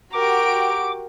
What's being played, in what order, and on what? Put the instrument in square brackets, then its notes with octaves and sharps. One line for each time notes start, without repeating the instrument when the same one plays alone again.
[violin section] F#4 G4 D7 [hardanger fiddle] A#4 [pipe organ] D6